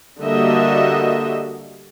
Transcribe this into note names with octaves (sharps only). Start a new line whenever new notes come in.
D3 G3 A#3 F#4 D#5 E5